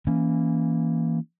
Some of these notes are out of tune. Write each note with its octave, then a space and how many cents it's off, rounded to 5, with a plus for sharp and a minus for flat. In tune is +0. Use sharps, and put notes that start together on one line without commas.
E3 +0 A#3 +0 C#4 +0